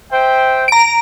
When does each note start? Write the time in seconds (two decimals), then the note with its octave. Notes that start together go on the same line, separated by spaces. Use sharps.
0.12 C5 E5 G5
0.68 A#5 D7